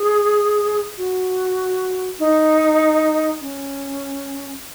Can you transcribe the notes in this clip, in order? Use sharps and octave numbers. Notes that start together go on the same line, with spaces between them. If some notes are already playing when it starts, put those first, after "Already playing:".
Already playing: G#4
F#4
D#4
C#4